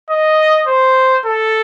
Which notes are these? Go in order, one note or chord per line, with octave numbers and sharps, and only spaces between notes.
D#5
C5
A4